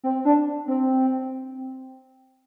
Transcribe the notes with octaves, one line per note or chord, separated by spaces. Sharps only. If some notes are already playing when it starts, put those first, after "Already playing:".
C4
D4
C4